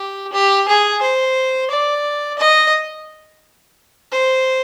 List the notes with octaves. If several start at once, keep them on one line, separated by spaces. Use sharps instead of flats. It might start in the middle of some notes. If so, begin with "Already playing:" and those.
Already playing: G4
G4
G#4
C5
D5
D#5
C5